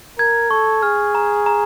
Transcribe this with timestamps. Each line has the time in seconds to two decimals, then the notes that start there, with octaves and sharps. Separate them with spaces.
0.19 A#4 G#6
0.50 A4 C#6
0.83 G#4 F6
1.15 A#5
1.46 A#5